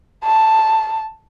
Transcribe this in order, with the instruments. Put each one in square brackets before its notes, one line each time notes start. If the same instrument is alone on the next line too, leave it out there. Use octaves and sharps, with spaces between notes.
[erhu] A5